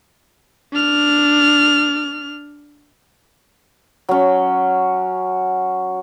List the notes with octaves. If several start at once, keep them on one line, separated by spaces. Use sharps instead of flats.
D4 F6
F#3 C#4